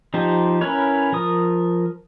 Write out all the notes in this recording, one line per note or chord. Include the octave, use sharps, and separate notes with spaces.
F3 D#4 G4 C5
C#4 E4 A#4 B4 C#5
F3 A#4 D#6